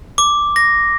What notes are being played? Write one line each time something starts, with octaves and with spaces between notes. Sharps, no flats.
D6
A#6